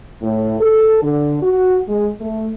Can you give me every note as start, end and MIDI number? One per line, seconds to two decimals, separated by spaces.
0.21 0.57 45
0.60 0.99 69
1.02 1.36 50
1.43 1.80 66
1.88 2.09 56
2.20 2.50 57